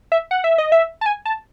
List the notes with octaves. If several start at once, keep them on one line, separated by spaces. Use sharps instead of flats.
E5
F#5
E5
D#5
E5
A5
G#5
A5